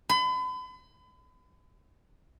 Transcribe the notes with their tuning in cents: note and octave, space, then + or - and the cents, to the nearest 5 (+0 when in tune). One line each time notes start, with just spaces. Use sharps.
B5 +40